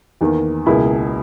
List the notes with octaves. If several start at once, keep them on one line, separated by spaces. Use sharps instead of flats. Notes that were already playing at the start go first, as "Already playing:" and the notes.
E2 D#3 A#3
C#2 B2 A#3 E4 G#4